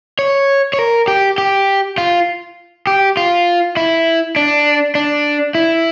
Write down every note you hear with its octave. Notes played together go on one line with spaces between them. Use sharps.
C#5
C#5
A#4
G4
G4
F4
G4
F4
E4
D4
D4
E4